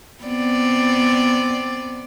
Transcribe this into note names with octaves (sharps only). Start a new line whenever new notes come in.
B3 C4 D5